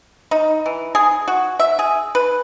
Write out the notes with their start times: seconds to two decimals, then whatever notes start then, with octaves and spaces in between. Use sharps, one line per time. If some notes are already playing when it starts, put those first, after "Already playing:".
0.31 D#4
0.66 E3
0.95 G#4
1.28 F#4
1.59 E5
1.79 G#4
2.15 B4